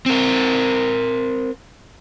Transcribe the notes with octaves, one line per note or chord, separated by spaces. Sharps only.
C4 A#4